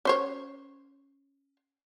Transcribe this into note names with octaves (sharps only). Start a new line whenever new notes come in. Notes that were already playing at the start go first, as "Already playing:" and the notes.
C#4 C5 C#5